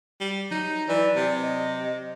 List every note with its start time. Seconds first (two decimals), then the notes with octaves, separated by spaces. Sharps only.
0.20 G3
0.51 F#3 D#4
0.88 E3 D5
1.16 C3
1.42 D#5